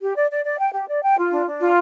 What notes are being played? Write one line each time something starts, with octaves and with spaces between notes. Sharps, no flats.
G4
D5
D5
D5
G5
G4
D5
G5
F4
D4
D4
F4